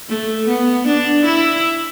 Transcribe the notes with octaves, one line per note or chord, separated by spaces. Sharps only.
A3
B3
D4
E4